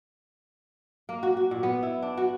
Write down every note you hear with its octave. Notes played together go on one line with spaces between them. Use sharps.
A#3
F#4
F#4
A#2
B3
E4
D4
F#4